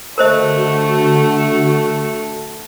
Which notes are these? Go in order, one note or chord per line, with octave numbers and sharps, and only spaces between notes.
D3 A3 F#4 A#4 C5 D#5